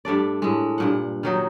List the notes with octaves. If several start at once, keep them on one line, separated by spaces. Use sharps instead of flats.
G2 A3 D4 D5
A2 G#3
G2 A#2 F#5
D#3 F#3 D#4